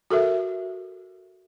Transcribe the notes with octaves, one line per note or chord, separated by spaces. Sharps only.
F#4 A4 A#4 E5